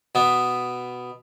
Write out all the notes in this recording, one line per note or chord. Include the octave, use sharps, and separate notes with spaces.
B2 B3